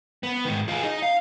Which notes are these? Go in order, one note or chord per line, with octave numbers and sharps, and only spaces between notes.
B3
G#2 D#3
F4 G#4
D#4
F5